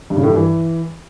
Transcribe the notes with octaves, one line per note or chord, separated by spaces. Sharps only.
G2
C#3
A2
G2
E3